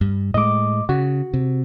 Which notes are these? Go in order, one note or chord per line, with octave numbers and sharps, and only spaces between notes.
G2
A2 G#3 D#5 D6
C#3 F#4
C3